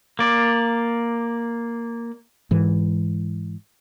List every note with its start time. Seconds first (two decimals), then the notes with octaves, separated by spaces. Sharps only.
0.19 A#3 D5
2.51 G#2 E3